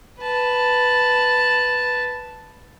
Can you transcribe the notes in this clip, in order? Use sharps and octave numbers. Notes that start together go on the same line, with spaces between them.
B4 A5